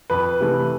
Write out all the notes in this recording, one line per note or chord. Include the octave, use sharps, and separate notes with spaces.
F2 B4
C3 E3 A3